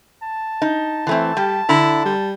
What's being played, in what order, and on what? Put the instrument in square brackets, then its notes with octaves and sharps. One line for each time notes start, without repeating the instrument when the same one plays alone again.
[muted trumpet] A5
[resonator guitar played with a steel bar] D#4
E3 A3 C4
[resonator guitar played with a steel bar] G3 [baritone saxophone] G4
[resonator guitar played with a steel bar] D3 A#5 [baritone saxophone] E4
[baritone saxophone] G3